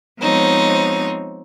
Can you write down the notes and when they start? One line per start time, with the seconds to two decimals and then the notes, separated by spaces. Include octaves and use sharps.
0.21 F3 G#3 B3 C4 D#4 C#5